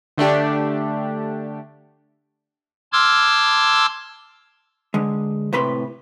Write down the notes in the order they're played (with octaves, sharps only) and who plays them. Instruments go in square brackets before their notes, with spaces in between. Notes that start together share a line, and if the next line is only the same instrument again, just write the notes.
[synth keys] D3 A3 D4 G4
[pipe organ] A5 C6 D6 E6 F6 G#6
[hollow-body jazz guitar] D3 G#3
A2 C3 B4 B5 C6